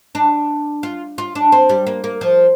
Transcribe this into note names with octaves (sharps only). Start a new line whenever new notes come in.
D4
F4
F4
D4
C4
G3
A#3
A#3
F3